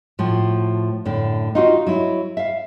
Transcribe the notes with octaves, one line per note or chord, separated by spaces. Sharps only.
A2 F3 F#4
F#2 A2 D3
D#4 F4 F#4
F#3 E4
E5 F5